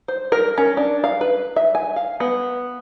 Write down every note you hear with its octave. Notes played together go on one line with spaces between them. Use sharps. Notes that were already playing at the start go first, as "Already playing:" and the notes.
C5
A#4
C#4
D4
F5
B4
E5
G#5
F5
B3